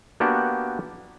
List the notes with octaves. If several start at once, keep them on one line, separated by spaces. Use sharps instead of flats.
A#3 B3 D4 F#4 G4